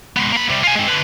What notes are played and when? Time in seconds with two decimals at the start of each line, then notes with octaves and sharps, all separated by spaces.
0.16 G#3 B3
0.32 A#3 B5
0.50 C3 G3
0.63 F4 G#5
0.75 G#3 C4
0.87 D3 B4